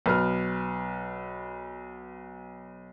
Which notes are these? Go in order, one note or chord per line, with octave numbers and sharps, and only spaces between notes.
B1 B4 F6